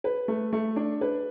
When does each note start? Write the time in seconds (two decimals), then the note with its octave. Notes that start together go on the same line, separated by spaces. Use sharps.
0.04 B4
0.28 A3
0.53 A3
0.76 D4
1.01 B4